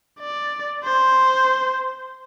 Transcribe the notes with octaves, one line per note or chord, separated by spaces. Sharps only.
D5
C5